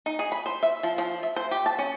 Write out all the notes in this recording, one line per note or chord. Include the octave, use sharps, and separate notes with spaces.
D#4
G#4
B5
C5
E5
F3
F3
E5
C5
G4
A5
C#4